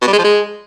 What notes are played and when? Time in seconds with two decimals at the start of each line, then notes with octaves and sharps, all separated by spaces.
0.02 B2
0.07 G3
0.13 G#3
0.19 F3
0.24 G#3